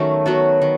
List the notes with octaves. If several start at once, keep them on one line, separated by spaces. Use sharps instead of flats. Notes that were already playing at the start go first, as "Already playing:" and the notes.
Already playing: D#3 F#3 A3 B3 C#4
F#3 B3 F#4
D#3